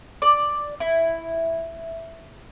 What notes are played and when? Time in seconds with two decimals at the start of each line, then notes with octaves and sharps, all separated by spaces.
0.22 D5
0.80 E4